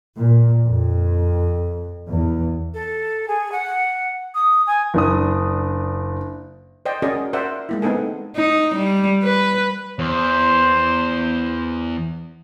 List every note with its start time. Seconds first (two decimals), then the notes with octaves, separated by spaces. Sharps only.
0.17 A#2
0.64 F2
2.06 E2
2.74 A4
3.28 G#4
3.52 F#5
4.34 D#6
4.67 G#5
4.94 F#1 D4 D#6
6.85 C5 D5 D#5 G5
7.02 C#4 F#4 G#4 A#4 D5 D#5
7.33 A#4 C5 D5 E5 F#5
7.69 G#3 A#3 E4
7.82 G#3 B3 C4 D#4 A4 G#5
8.36 D#4
8.76 G3
9.23 B4
9.99 E2 C5